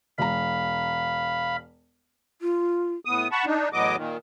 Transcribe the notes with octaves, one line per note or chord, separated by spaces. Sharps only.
E1 F5 A#5 B5
F4
A2 B3 D#6
F#5 A5 B5 C#6
D4 D#4
E2 A2 F#3 B3 D#5 D6
A#2 D#3